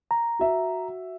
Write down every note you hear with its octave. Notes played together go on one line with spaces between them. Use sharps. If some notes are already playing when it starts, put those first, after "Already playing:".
A#5
F#4 E5